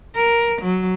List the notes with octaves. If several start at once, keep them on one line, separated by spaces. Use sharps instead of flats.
A#4
F#3